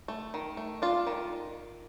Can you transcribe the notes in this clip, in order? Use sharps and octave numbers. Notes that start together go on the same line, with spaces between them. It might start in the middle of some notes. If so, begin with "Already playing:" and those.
A3
D#3
A3
D4 F4
D#3